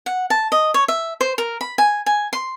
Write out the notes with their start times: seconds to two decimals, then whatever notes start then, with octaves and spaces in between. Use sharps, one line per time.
0.06 F#5
0.30 A5
0.52 D#5
0.74 C#5
0.88 E5
1.21 C5
1.38 A#4
1.61 B5
1.78 G#5
2.06 G#5
2.33 C6